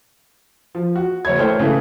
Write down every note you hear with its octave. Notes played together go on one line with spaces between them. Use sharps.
F3
F#4
F#1 C#5 G#6
E3 A3 C5 C#5 G5 F6
C#3 E3 A3